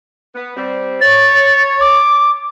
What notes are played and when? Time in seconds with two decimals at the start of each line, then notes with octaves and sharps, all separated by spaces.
0.35 B3
0.57 G3 C4
1.01 C#5 A6
1.81 D6